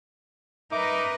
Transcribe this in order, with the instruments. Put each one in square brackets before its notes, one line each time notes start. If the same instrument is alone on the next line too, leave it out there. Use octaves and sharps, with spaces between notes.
[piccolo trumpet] D#4 [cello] A#4 B4 [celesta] E5 [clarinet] D6